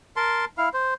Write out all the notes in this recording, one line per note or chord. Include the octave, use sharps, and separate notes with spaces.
A#4 A5 C6
E4 F5
C5